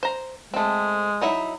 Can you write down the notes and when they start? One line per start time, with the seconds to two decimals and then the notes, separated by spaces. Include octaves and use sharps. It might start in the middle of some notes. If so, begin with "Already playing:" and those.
0.03 C5 A#5
0.54 G#3 A3 C4
1.21 F#3 D#4 E4